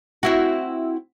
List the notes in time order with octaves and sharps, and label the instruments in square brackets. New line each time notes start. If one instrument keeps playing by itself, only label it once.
[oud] C4 E4 F#4